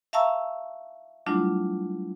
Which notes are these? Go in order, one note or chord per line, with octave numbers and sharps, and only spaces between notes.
E5 F5 A5 A#5 C#6 E6
F#3 G3 A3 D4 E4 F4